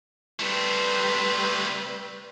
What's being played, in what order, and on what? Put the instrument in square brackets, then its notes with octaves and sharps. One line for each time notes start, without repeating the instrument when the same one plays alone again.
[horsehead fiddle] G3 B4 [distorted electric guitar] A3 C4